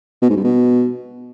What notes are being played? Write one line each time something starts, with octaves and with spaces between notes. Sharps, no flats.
B2
G#2
G2
B2